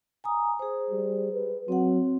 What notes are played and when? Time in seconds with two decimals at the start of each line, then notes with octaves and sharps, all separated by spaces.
0.24 G#5 A#5 D#6
0.59 G#4 C5
0.90 G3
1.33 B4
1.68 F#3 C4 F#5